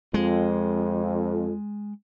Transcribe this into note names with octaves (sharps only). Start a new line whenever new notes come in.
F2 G#3